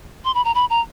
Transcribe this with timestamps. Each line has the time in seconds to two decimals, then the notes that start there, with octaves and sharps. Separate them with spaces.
0.25 C6
0.35 B5
0.45 A#5
0.55 B5
0.70 A#5